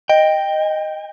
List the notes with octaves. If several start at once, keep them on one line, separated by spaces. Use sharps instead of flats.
D#5 G5